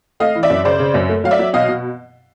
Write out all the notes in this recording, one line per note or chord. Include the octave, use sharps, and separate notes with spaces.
A3 D#5 F5
E3
D5 E5
F#2
C#3 C5 D5
C#3
F#2
A3
F#3 F5
D5 E5
F#3
B2 D#5 F5
B2